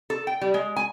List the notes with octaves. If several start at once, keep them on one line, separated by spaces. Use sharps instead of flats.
A4
G5
G3
G#3
G#5